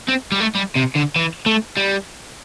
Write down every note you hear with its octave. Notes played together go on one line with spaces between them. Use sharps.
C4
G3
A3
G3
C3
D3
E3
A3
G3